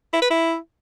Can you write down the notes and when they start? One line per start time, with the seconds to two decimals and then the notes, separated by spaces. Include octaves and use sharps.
0.13 E4
0.22 B4
0.30 E4